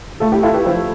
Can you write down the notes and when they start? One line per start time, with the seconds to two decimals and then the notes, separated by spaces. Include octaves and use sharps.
0.20 A3 F4 A4
0.32 E4 G4
0.43 E4 F4 A4
0.54 G4 B4
0.66 F3 A4 C5